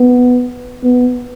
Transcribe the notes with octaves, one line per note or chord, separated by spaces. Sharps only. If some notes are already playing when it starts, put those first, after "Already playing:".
Already playing: B3
B3